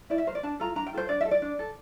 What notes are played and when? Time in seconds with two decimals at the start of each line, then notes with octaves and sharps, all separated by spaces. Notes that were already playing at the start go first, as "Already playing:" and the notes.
0.10 E4 D5
0.18 E5
0.27 A#4 C5
0.35 D5
0.43 D4 A5
0.60 F4 A4 A#5
0.76 D4 A#5
0.87 G5
0.93 F4 A4 C5
1.09 D4 D5
1.21 E5
1.25 A4
1.31 D5
1.42 D4
1.59 A4